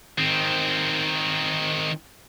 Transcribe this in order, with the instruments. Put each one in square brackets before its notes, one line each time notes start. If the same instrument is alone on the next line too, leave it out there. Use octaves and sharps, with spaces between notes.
[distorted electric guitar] D#3 C4